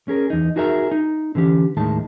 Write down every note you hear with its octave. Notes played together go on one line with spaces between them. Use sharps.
C#4 G#4 A#4
E2 D#4
D#4 F#4 G#4 A#4 E5 A#5
D#4
D3 E3 C#4 G4
D#2 A2 D#3 G#3 A5